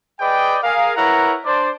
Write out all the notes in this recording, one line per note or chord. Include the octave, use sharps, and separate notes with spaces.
G#4 B4 D5 D#5 G5
G#4 A#4 F5
E4 A#4 B4 C#5 F#5 A#5
D4 C5 D5